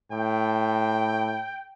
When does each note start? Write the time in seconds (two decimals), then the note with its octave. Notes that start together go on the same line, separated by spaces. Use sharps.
0.12 A2 G5